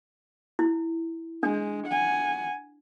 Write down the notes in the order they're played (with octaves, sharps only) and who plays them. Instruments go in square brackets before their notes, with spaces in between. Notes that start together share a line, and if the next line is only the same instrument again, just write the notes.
[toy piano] E4
[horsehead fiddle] G#3 [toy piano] D4
[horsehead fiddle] F#5 G#5